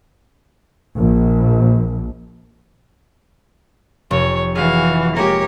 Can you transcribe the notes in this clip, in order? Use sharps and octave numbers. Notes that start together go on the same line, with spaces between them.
A#1
F1 C#5
E3 F#4 G#4 F5
G#3 A#3 G4 A#4 C#5